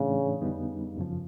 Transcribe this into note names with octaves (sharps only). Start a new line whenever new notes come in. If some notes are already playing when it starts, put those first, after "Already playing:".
Already playing: A2 C#3 E3 A3 D4
F2 D3 G3 B3 D#4
F#2 C#3 F3